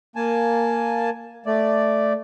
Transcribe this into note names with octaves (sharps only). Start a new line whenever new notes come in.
A#3 G#5 A5
A3 D5